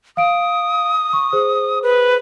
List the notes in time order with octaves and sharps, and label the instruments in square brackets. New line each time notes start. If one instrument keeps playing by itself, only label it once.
[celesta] F5 D7 [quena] D#6
[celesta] C#6
G#4 C5
[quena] B4